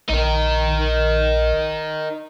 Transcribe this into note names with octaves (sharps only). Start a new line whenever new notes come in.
A#1 D#4 A#4